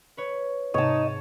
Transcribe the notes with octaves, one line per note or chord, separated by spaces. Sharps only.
B4 C#5
G#2 C3 D#4 C#5 D#5 A5